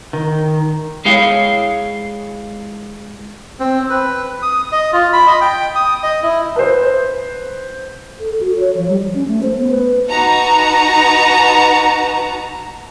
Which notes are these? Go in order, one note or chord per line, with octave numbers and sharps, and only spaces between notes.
D#3
G#3 E4 G#4 C#5 F5 G5
C4
B4
D#6
D#5
F4
B5
D#5
G5
D#6
D#5
E4
B4 C5
A4
F#4
C#5
F3
G3
F3
C#4
A3
C5
B3
B4
D#4 F#4 B4 A5 A#5